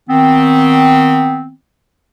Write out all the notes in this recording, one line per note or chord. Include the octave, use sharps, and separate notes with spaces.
D#3 B3 C4